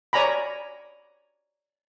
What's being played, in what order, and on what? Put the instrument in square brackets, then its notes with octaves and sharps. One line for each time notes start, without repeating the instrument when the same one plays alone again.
[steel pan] C#5 D5 G#5 A#5 B5